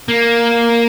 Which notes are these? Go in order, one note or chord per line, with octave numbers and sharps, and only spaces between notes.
A#3